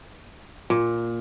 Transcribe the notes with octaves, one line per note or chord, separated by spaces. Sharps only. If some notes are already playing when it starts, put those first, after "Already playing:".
A#2